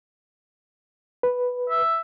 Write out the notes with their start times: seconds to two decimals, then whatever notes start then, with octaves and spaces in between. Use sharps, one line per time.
1.23 B4
1.70 E5